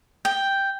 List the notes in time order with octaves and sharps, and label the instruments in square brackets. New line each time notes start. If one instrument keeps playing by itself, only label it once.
[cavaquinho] G5